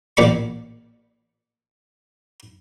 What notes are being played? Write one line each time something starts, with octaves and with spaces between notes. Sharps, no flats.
A1 A#2 D5 B5 C#6